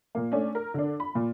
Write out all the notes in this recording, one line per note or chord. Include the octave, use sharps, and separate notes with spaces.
A#2 A#3
A3 C#4 D4
A#4
D3 D4
B5
A#2